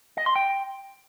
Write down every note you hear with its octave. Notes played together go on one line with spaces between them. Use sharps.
D#5
C6
G5